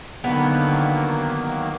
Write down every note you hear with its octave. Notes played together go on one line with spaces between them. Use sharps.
D3 D#3 F#3 A#3 B3